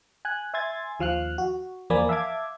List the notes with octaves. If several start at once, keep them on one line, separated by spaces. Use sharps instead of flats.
G#5 F#6
E5 G#5 C6 G#6 A6
D#2 F3 F5 F6 F#6
F#4
E2 F3 A#3 D5 G#5 B5
E5 F5 A5 D6 G#6